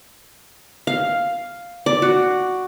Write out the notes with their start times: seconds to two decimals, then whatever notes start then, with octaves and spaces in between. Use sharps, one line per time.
0.87 F5
1.86 D5
2.02 F#4